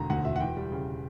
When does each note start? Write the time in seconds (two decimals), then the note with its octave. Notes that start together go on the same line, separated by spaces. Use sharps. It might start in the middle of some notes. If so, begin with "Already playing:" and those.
Already playing: E1 D3 A#5
0.10 D2 F#5
0.25 E1 E5
0.36 F#5
0.40 E3 G5
0.57 G3
0.72 C#3